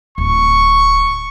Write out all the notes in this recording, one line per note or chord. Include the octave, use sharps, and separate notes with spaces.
D1 C#6